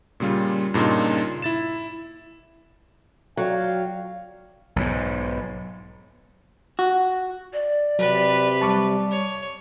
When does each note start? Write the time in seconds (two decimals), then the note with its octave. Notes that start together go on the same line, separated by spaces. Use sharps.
0.20 A#2 C#3 G3 F4
0.74 G2 A#2 C#3 D#4 C6
1.42 E4 A6 E7
3.37 F#3 D5 F5 G5
4.76 B1 G#2
6.79 F#4
7.53 D5
7.99 C3 F#3 G4 B4
8.61 G3 A5 C#6 D6
9.11 C#5